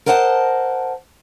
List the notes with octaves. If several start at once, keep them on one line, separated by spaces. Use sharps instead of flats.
A#4 C5 D#5 F#5 G5 A5